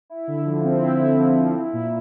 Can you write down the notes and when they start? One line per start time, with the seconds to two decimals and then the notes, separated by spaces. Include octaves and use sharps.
0.10 E4
0.28 D3
0.46 F3
0.64 C4
0.82 E4
1.00 D3
1.18 F3
1.36 C4
1.54 E4
1.73 A#2